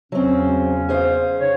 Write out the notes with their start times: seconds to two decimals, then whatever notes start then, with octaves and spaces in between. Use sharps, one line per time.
0.12 E2 C#3 F#3 C4 C#4
0.89 G#4 C5 F5
1.40 C#3 D#4 C#5